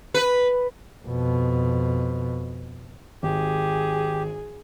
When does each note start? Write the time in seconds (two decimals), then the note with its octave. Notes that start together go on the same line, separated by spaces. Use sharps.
0.14 B4
1.05 F2 B2
3.23 G#1 G4 G#4